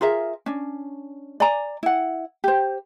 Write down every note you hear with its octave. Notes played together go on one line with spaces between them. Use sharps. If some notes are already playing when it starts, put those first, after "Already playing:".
F4 G#4 A#4 E5
C#4 D4
D5 G#5 A#5
E4 F#5
G4 C5